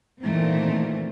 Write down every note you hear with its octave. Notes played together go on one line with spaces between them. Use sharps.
A#2 D#3 E3 A3 C4